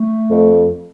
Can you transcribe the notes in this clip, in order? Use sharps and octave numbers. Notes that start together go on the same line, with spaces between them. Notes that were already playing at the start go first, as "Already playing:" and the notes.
Already playing: A3
F2